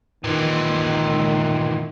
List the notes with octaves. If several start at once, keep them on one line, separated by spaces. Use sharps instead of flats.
A#2 D#3 E3